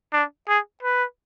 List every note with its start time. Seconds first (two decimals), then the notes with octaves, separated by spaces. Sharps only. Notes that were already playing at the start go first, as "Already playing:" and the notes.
0.13 D4
0.48 G#4
0.83 B4